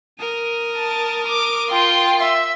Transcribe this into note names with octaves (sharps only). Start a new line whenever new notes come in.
A#4 D#6
A5
D6
F4 G5 C6
E5